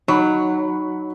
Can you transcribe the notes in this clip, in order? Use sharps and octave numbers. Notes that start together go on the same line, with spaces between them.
F#3 D#4 B5 C#6